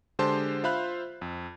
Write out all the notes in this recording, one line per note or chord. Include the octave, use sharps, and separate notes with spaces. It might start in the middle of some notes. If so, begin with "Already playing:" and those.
D3 G#3 G4 C5 A5 C6
F4 C5 E5 F5 B5 F#6
F2